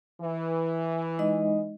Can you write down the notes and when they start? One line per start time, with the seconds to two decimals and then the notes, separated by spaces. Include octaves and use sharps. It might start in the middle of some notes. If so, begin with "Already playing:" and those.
0.22 E3
1.19 G#3 D#4 D#5